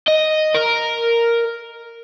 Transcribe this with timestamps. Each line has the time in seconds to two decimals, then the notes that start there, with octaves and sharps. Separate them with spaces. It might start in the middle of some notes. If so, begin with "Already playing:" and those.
0.08 D#5
0.54 A#4